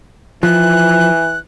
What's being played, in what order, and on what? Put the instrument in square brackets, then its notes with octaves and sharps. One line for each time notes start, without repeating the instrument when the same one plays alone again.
[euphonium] E3 [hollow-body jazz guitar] F3 [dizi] F#6